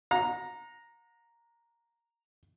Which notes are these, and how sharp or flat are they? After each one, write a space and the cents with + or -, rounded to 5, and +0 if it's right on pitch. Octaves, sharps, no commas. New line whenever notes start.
F#5 -40 A#5 +0